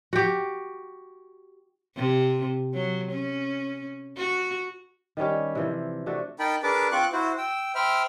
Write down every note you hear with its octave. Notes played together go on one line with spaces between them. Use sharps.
F#4 G4
C3
F#3
C#4
F#4
D#3 G3 C#4 G4
C3 E3 F3
C3 A3 D4 F#4
D#4 A#4 G5 A5 B5
D4 G#4 A#4 B4 A5 D6
C4 F4 C#6 D6 F#6
E4 F#4 C5
G5 E6
C5 E5 G5 B5 F6